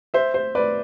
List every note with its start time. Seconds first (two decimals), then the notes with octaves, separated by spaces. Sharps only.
0.14 C5 E5
0.34 C5
0.55 B4 D5